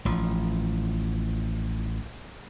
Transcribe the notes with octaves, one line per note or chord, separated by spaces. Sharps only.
A1 F3